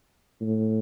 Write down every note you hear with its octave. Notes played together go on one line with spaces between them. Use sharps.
A2